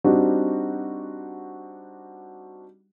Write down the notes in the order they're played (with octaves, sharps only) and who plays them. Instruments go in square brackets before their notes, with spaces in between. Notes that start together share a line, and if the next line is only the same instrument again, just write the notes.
[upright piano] G3 C4 D4 D#4 F#4